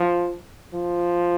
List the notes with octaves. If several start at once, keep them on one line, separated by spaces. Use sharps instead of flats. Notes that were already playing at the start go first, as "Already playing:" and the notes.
Already playing: F3
F3